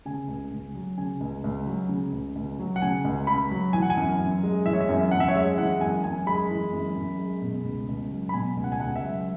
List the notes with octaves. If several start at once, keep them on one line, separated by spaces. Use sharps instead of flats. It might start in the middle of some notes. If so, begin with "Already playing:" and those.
C#3 G#5
C#2
C#2
F#3
C#3 G#5
C#2
C#2
F#3
C#3
C#2
C#2
F#3
F#5
C#3 G#5
C#2
C#2 B5
F#3
E3 G#5
F#5
G#5
F#2
F#2
G#3
E3 E5
C#5
E5
F#2
F#2 F#5
E5
C#5
G#3 E5
E3 F#5
F#2 G#5
F#2 G#5
G#3 B5
E3
F#2
F#2
G#3
B2
C#2
C#2
F#3
B5
B2 G#5
C#2
F#5
G#5
C#2 F#5
E5
F#3